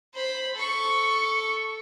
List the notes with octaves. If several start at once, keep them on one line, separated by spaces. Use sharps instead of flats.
C5 B5
A4 C#6